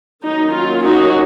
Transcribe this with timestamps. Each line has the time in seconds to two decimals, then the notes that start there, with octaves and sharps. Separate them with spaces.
0.24 D#3 F#3 A#3 C#4 D#4
0.53 F4
0.84 D#4 F#4